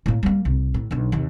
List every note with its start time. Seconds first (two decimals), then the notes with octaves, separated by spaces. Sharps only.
0.06 A2 A#3
0.23 G3 A#3
0.45 C2 C3
0.74 A2
0.91 B1 D4
1.12 D#2 C3